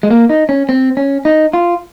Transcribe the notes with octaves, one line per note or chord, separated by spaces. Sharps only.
G#3
A#3
D#4
C#4
C4
C#4
D#4
F4